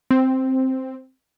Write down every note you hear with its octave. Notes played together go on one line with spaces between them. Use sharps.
C4